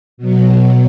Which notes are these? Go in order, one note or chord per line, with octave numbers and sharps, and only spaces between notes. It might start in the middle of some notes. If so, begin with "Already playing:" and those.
B2 F#3